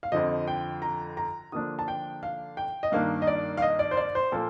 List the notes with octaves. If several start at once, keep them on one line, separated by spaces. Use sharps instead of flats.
F5
F2 D3 F3 D#5
G5
A#5
A#5
D3 F3 A#3 D4 D#6
A5
G5
F5
G5
D#5
G2 D#3 A#3 D4 F5
D#5
D5
F5
D#5
D5
C5
D5
C5
A#2 F3 A#3 A4